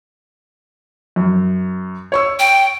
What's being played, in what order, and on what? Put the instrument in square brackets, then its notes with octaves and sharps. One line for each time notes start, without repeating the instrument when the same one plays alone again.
[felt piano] F#2
C#5 C#6 E6
[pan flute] G5